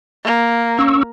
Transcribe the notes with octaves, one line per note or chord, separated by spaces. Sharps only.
A#3
C#4 C#6 E6